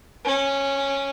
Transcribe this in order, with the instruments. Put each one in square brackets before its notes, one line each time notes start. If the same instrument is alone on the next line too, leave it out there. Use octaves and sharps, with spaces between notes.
[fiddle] C#4